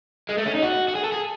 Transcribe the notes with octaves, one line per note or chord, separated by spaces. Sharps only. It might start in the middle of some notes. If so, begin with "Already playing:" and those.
G#3
A3
C#4
D#4
F#4
F#4
G#4
A4
G#4